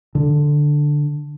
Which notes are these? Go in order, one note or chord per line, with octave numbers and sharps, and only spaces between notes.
D3